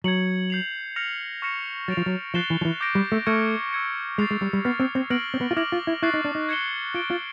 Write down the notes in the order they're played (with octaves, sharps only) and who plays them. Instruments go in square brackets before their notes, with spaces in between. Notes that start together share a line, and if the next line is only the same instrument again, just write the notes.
[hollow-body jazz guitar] F#3 [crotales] G#6 C#7 F#7
[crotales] G6 C7 F7
F6 A#6 C#7 F7
C#6 F6 A#6 C#7 E7
[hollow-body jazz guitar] F#3 [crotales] A6 D7 F7
[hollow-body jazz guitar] F3
F#3
[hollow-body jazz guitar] F3 [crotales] F#6 A6 C7 E7 G7
[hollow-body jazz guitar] E3
F3
E3
[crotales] D6 G6 A#6 D7
[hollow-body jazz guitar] G3
A3
[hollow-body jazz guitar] A3 [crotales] C#6 F6 G#6 C#7
[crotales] E6 G#6 C#7
[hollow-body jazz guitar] G#3 [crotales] A6 C7 F7
[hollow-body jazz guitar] G#3
G3
G3
[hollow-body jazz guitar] B3 [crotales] F6 A6 C7
[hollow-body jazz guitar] C4
C4
[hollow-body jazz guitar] B3 [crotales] F6 A#6 D7 F#7
[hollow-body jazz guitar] C4
B3
F4
[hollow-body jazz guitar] E4 [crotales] D6 F6 A#6 D7 F#7
[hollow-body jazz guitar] F4
E4
[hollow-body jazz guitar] E4 [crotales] C#6 F#6 A6 C7
[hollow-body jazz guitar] D#4
D4
D#4
[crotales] G#6 C#7 E7 G7
[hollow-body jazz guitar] F4 [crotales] A6 D7 G7
[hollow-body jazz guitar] F4